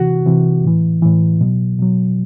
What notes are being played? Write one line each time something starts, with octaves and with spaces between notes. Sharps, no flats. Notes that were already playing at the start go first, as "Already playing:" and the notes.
Already playing: C3 E3 F#4
C3 E3
A2 E3
A2 E3
B2 F#3
B2 F#3